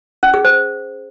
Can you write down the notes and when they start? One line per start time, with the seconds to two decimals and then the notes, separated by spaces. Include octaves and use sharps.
0.23 C#4
0.34 G#4
0.45 C5